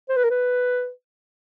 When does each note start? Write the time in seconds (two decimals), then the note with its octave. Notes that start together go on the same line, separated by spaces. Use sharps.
0.09 C5
0.16 B4
0.23 A#4
0.30 B4